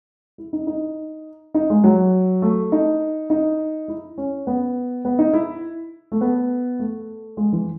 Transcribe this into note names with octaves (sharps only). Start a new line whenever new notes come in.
E4
D#4
D#4
D#4
G#3
F#3
A3
D#4
D#4
E4
C#4
B3
B3
D#4
E4
A3
B3
A3
G#3
E3